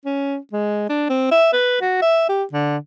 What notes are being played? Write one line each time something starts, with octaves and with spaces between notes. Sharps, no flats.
C#4
G#3
D4
C4
E5
B4
F#4
E5
G4
D3